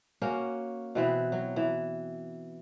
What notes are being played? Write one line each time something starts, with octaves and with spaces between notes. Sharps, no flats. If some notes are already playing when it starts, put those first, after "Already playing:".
A#3 C#4 F#4
B2 E3 C4 B4
F#3
E3